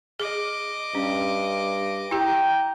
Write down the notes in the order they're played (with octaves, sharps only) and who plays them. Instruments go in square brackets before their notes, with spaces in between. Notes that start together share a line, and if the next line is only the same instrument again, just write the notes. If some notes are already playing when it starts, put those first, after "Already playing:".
[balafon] G#4 [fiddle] D#5 D6
[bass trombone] G2 [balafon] C#4
[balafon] E4 G4 [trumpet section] G5 A#5